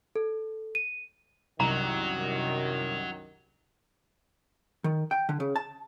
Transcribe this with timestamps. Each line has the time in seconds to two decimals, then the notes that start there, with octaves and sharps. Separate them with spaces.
0.16 A4
0.75 D#7
1.60 C2 F#2 D#3 F#3 A#5
4.84 D#3
5.11 G5
5.29 D3
5.40 C#3
5.56 A5